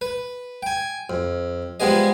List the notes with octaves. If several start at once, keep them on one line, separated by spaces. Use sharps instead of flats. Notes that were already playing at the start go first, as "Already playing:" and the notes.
B4
G5 G#5
F2
F3 G3 G#3 B3 G#4 D#5